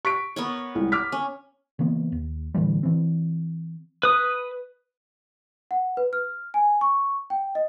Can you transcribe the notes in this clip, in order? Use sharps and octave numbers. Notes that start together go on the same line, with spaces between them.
C#6 B6 D7
B3 A#4 C#5
C2 G#3
D6 F6 B6
C#4
C#3 E3 A#3 B3
D#2
A2 D3 E3 G3
E3 C4
B4 D#6
F#5
B4
F6
G#5
C#6
G5
D#5